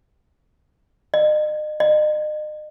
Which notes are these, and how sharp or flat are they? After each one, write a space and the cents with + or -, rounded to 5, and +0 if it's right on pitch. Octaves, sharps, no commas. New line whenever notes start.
D#5 -40
D#5 -40